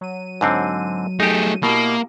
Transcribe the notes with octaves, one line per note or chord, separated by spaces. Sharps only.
F#3 D#7
G#2 D3 C4
A3 D#4 G4 G#4
B2 A#3 E4 G4